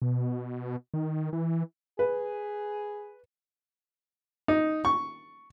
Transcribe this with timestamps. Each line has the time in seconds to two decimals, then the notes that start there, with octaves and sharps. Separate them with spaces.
0.02 B2
0.94 D#3
1.33 E3
1.99 G#4 B4
4.48 D#4
4.85 C#6